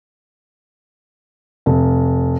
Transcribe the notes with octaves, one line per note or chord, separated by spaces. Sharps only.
F1